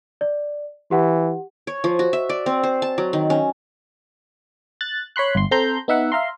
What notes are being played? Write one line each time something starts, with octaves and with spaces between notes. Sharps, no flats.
D5
E3 G4 F#5
C#5
F3
F#4
E5
D5
C4
C5
A5
F#3
D#3
C#4
F#6 A6
C#5 B5 C6 F#6
G1 C6
C4 A4 A#5 C6 G6
B3 D#4 E5 F#5
E5 F5 A#5 C6